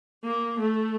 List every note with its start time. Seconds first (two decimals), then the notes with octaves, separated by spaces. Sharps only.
0.24 A#3
0.60 A3